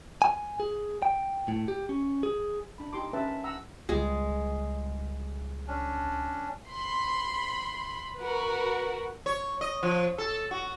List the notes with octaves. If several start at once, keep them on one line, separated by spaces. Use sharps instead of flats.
G#5
G#4
G5
A2
G4
C#4
G#4
D4 B5
D#4 G4 C6 D6
C#4 G#4 A#4 B4 E5 A5
F#5 A#5 E6
C#2 G3 G#3 G#4
C#4 D4
B5 C6
F#4 A#4 B4
C#5
D#5
F3
A4
F#4